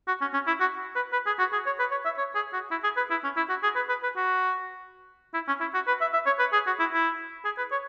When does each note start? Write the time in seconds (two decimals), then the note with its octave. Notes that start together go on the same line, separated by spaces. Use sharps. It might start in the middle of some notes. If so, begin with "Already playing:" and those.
0.07 F#4
0.21 C#4
0.34 C#4
0.47 E4
0.60 F#4
0.95 B4
1.12 B4
1.26 G#4
1.39 F#4
1.53 G#4
1.66 C#5
1.79 B4
1.91 C#5
2.05 E5
2.18 C#5
2.35 G#4
2.53 F#4
2.71 E4
2.84 G#4
2.97 B4
3.11 E4
3.24 C#4
3.37 E4
3.49 F#4
3.63 G#4
3.76 B4
3.89 B4
4.03 B4
4.16 F#4
5.34 E4
5.48 C#4
5.60 E4
5.74 F#4
5.87 B4
6.01 E5
6.13 E5
6.26 C#5
6.39 B4
6.53 G#4
6.67 F#4
6.79 E4
6.93 E4
7.45 G#4
7.58 B4
7.72 C#5